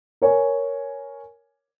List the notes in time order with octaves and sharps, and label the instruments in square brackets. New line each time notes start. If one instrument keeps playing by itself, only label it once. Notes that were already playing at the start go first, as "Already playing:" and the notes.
[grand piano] A#4 C#5 G#5